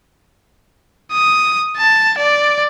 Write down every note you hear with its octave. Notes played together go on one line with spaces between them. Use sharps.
D#6
A5
D5